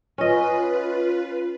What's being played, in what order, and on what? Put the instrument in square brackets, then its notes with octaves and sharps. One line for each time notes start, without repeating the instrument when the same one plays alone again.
[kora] C#4 D#5 [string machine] F4 B4